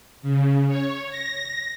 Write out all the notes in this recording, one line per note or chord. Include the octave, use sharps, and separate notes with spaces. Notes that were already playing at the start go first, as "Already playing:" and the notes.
C#3
C#5
A#6